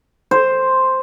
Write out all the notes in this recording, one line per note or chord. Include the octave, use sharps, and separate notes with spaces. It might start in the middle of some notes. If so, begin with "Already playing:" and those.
C5